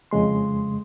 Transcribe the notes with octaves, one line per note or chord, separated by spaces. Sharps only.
F2 C#3 G#3 C6